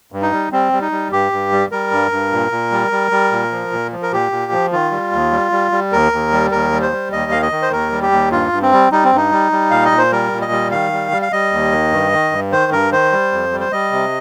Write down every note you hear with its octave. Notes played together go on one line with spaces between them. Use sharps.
G2
D#4
G3
G3 C4
G3
D#4
G3
G2 G4
G2
G3
G3 A#4
G2
G2
A#2
A#2
G3
G3
G3
A#2
F3
A#2
F3
A#4
A#2 G4
A#2
F3
D#3 F4
G3
D#2
G3
G3
G3
D#2 A#4
D#2
G3
D#2 A#4
G3
C5
G3
D#2 D#5
D#3 F5
D#5
D#3
C5
D#2 A#4
G3
G4
D#2
G2 F4
G2
C4
G3
G3 D#4
C4
G2 D#4
G3
G3
A#2 F5
D#5
A#2
C5
G3 A#4
A#2
D#5
G3
D#3 F5
G3
G3
F5
G3 D#5
D#2
D#3
G2
D#3
G2
D#3 C5
G2 A#4
D#3 C5
G3
F2
G3
C5
G3 D#5
C3